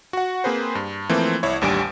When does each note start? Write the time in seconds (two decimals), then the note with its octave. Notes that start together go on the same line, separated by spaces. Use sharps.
0.13 F#4 F#5
0.44 A#3 C4 G#4 B4 C5
0.75 G2
1.09 E3 F3 A3 A#3 C4
1.43 C2 E4 C#5
1.61 A1 D#2 G3 D4 G#5 D7